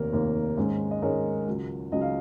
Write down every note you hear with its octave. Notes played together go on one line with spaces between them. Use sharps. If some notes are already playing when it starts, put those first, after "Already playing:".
Already playing: F1 D#2 D#3 A#3 A#4
F1 D#2 D#3 A#3
G#2 D#3 G#3 C#4
D#5
G#2 D#3 G#3 C#4 A#4 C#5
C#2 C#3 F#3
C#2 C#3 F#3 D#5
F5